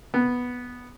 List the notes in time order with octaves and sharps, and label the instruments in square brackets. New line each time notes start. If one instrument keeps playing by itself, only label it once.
[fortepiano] B3